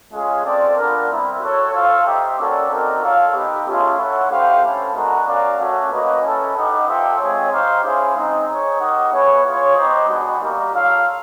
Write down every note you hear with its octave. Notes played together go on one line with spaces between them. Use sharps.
G#3 C#4 F4 G#4
C4 F4 A4 D5
B3 D4 F4 A#4
G3 C4 E4
F#4 A4 C#5
F4 A4 C5 F5
D#4 G4 C5 E5 G5
A#3 C#4 F#4 A4 D5
C4 D#4 F#4 A#4 D5
F4 A4 C#5 F5
B3 D#4 G4
A3 C#4 F4 G#4
E4 A4 C#5 F#5
A3 D4 G4 C5 F5
C#4 E4 A4
G#3 B3 D4 F#4 A#4
C#4 F#4 A#4 D5 F5
A3 C#4 F#4
A#3 C#4 F#4 B4 D#5
C#4 E4 A4
D#4 G4 B4 D#5 F#5
F4 A4 C5 E5 G5
G#3 C4 F4 G#4 C#5
D#4 G4 C5 F5
C#4 E4 G#4 C5 F5
G#3 C4 D#4
D#4 G#4 C#5
D#4 G4 A#4 D#5 F#5
B3 E4 G#4 C#5
F4 G#4 C#5
B3 D#4 G4 C5 D#5
G#3 B3 D4 F#4
G3 A#3 D#4 G4 A#4
F4 A4 C#5 F5